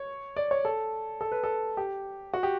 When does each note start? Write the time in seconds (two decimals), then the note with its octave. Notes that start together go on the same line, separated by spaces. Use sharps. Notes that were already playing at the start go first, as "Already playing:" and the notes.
Already playing: C#5
0.37 D5
0.51 C#5
0.65 A4
1.21 A4
1.32 B4
1.44 A4
1.77 G4
2.34 F#4
2.43 G4